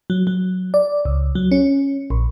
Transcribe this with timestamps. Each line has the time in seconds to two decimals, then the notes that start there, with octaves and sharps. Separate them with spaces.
0.10 F#3
0.27 F#3
0.74 D5
1.05 C#2
1.35 F#3
1.52 C#4
2.10 A#1